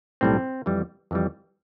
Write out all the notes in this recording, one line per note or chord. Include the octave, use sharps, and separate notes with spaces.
B1 A2 G3 C4
F2 E3 G3
F2 E3 G3